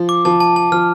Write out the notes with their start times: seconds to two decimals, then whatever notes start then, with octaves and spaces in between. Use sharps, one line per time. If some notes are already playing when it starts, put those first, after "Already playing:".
Already playing: F3
0.09 D6
0.25 F3 A5
0.40 A5
0.56 A5
0.72 F3 F6